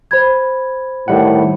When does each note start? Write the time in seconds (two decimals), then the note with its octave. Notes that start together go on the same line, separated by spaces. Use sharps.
0.11 C5 B5 G#6
1.08 A2 D#3 G3 F#5